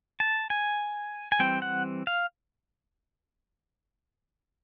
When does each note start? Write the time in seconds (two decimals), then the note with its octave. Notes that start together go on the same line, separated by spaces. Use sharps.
0.20 A5
0.50 G#5
1.32 G#5
1.39 E3 G3 C4 G5
1.62 F#5
2.07 F5